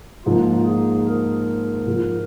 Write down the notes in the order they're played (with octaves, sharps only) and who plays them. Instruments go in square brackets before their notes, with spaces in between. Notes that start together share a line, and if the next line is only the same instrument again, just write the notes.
[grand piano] G#2 F3 A#3 [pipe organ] F4
[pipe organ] G#4
A#4
[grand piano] G#2 F3 G#3 F4